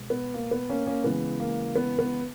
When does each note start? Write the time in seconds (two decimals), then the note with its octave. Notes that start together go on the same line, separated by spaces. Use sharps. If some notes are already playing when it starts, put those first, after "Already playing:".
Already playing: B2 G#3
0.10 B3
0.34 A#3
0.51 B3
0.69 A#3 C#4
0.87 A#3 C#4
1.04 C#3 E3 G#3 B3
1.40 A#3
1.76 B3
1.99 B3